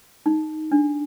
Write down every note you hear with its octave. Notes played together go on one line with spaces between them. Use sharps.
D#4
D4